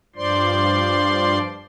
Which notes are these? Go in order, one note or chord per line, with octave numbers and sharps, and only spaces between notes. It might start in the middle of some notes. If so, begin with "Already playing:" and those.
G2 F3 C5 D5 C6